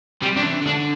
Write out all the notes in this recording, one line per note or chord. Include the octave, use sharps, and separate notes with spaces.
C3 G3
D4
E3
D3 D4